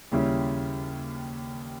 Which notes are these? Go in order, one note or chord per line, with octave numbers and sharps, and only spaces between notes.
D#2 C#3 G3 C#4 E4